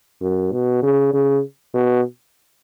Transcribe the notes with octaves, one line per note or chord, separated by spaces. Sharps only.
F#2
B2
C#3
C#3
B2